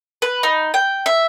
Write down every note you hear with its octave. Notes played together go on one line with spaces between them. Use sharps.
B4
D#4
G5
E5